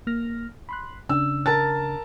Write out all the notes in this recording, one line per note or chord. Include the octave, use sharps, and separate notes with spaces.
A#3 F6 A#6
B5 C6 F#6
C#3 D4 E6
A#4 A5 A6